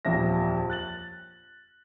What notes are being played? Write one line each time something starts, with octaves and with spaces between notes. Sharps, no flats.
D#1 A#1 F2 E5 A#6
F#6 A6 F#7